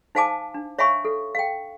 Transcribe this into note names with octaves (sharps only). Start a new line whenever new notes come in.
D#4 C5 F5 G#5 A5 D6
D4
C#5 E5 F5 G#5 B5 C#6
A4
F5 G5